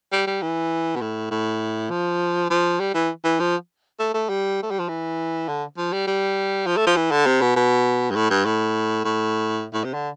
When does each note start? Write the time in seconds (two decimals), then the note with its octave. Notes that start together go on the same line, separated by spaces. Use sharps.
0.12 G3
0.27 G3
0.42 E3
0.96 B2
1.01 A2
1.31 A2
1.90 F3
2.50 F3
2.80 G3
2.94 E3
3.24 E3
3.40 F3
3.99 A3
4.14 A3
4.29 G3
4.63 A3
4.71 G3
4.79 F3
4.88 E3
5.48 D3
5.78 F3
5.93 G3
6.07 G3
6.67 F3
6.77 A3
6.87 F3
6.96 E3
7.11 D3
7.26 C3
7.41 B2
7.56 B2
8.11 G2
8.16 A2
8.30 G2
8.46 A2
9.04 A2
9.74 A2
9.84 C3
9.94 D3